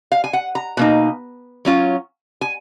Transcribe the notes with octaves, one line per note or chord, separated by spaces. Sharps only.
F5
G#5
F#5
A#5
B2 A#3 D#4
F#3 C#4 F4
G#5